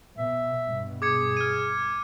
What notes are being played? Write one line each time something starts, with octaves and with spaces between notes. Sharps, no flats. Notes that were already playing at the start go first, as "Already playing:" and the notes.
B2 E5
G2 B2
G#4 D6 G#6 C#7
F6 D#7